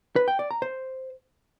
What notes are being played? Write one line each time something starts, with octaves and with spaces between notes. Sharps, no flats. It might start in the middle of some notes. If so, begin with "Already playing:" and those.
B4
G5
D5
A#5
C5